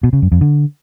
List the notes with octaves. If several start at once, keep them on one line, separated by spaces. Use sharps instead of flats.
B2
C#3
F#2
F2
D3